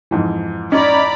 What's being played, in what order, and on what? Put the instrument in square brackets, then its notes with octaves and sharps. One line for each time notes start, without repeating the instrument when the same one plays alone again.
[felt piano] F2 G#2 E3
[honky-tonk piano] C#4 D#4 [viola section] D5 A#5 B5